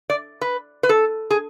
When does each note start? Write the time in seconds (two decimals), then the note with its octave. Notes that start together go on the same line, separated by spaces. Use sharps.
0.10 D5
0.41 B4
0.83 B4
0.89 A4
1.31 G#4